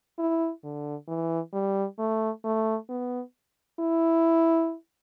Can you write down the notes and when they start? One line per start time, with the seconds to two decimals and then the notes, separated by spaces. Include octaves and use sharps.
0.19 E4
0.64 D3
1.08 E3
1.53 G3
1.99 A3
2.44 A3
2.89 B3
3.79 E4